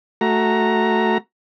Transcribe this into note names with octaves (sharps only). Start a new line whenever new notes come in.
A3 F#4 A#5